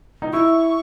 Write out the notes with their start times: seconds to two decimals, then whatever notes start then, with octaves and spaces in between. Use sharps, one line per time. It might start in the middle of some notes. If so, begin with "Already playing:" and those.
0.22 D#4
0.33 E4 C#6